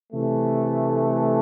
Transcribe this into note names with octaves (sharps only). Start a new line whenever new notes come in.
C3 E3 A3